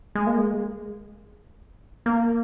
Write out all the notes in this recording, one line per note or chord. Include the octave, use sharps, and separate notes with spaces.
G#3
A#3
G#3
A#3